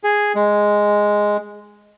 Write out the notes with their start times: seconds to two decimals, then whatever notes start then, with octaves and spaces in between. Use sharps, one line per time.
0.04 G#4
0.35 G#3